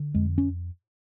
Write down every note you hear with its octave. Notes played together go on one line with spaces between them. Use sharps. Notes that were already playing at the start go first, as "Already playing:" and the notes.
Already playing: D3
F2 G#3
C#4